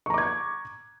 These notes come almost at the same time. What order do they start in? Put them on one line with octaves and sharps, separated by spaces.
C#6 A#5 D6 G#6